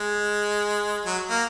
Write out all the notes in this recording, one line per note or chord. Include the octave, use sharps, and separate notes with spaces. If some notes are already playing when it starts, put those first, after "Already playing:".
Already playing: G#3
F#3
A#3